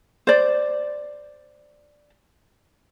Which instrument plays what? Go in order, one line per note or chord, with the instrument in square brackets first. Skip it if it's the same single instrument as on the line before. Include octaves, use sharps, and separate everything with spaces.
[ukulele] C5 D5